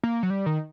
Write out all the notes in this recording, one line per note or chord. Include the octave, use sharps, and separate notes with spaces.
A#3
F#3
G3
D#3